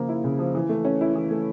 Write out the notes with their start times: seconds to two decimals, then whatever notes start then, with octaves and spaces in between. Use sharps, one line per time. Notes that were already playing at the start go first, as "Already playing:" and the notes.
Already playing: C#3 F3 A#3
0.09 E4
0.24 C#3
0.39 F3
0.55 E3
0.69 A3
0.85 C#4
1.01 E4
1.16 E3
1.31 A3